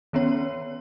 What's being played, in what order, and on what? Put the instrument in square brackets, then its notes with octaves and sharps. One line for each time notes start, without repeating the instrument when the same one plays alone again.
[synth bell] D#3 B3 C#4 C#5